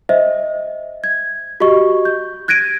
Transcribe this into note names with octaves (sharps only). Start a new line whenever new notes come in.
C5 D#5 E5
G#6
F#4 G4 D#5 C#6
G6
F#6 G#6 A#6 D7 D#7